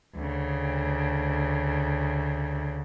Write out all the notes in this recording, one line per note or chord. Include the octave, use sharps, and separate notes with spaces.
D2 C#3